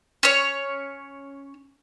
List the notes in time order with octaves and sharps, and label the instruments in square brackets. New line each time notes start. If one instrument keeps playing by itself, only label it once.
[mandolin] C#4 C#5